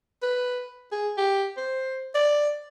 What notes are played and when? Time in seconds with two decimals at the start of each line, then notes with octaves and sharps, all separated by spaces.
0.23 B4
0.92 G#4
1.18 G4
1.57 C5
2.14 D5